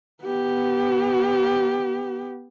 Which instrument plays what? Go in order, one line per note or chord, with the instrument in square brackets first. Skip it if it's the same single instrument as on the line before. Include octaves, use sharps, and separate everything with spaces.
[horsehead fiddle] B3 G4